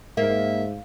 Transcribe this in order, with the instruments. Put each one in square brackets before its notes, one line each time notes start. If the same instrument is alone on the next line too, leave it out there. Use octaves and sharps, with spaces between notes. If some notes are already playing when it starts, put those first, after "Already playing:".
[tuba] G#2 [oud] A#3 [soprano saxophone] E5